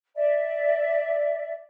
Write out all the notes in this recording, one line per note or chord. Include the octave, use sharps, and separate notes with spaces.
D5 E5